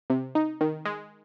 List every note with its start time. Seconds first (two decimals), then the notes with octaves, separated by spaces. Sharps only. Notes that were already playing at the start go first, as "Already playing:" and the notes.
0.10 C3
0.35 D#4
0.61 D#3
0.85 G#3